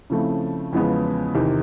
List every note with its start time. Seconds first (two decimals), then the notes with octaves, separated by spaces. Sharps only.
0.10 C#3 F3 A3 C4 E4
0.73 E2 C#3 F3 G#3 B3
1.34 E2 C3 D#3